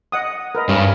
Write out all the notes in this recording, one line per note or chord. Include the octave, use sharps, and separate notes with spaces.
D#5 F#5 D#6
A#4 B4 D#5
G2 C#4